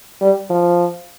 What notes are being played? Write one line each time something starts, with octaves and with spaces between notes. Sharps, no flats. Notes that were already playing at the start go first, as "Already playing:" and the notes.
G3
F3